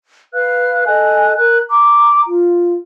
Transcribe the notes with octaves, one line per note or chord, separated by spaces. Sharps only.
B4 F5 F6 F#6
A4 D#5 G#5 F#6
A#4 F#6
A#5 D6
F4